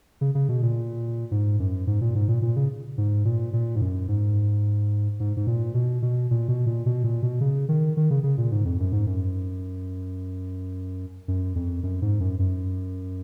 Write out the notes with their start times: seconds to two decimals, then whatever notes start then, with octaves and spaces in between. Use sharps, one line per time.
0.21 C#3
0.35 C#3
0.49 B2
0.63 A#2
1.31 G#2
1.59 F#2
1.87 G#2
2.01 A#2
2.15 G#2
2.28 A#2
2.42 A#2
2.56 C#3
2.98 G#2
3.25 A#2
3.53 A#2
3.75 G#2
3.81 F#2
4.08 G#2
5.20 G#2
5.37 G#2
5.47 A#2
5.74 B2
6.02 B2
6.31 A#2
6.48 B2
6.66 A#2
6.86 B2
7.04 A#2
7.22 B2
7.41 C#3
7.69 D#3
7.97 D#3
8.10 C#3
8.23 C#3
8.38 A#2
8.51 G#2
8.65 F2
8.80 F#2
8.92 G#2
9.06 F#2
11.28 F#2
11.55 F2
11.83 F#2
12.02 G#2
12.20 F#2
12.39 F#2